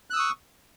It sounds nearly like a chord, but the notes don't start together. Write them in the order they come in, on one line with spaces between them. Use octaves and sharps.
F#6 E6 D#6 C#6